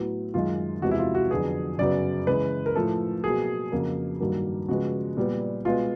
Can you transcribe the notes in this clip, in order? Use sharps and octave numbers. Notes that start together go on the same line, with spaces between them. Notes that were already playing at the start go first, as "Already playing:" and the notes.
Already playing: A2 F#3 B3
F#2 D#3 G#3 F4
E2 C3 F3 G#3 F#4
E4
F4
F#4
F2 D3 F#3 B3 G#4
F#2 C#3 F#3 B3 D5
C#3 E3 G#3 B4
A#4
A2 F3 A3 A4
B2 F#3 A#3 G#4
F2 C#3 F#3 A#3
G2 D#3 F#3 A#3
C#3 F3 G#3 B3 F#4
A#2 G3 B3
B2 G#3 B3 F4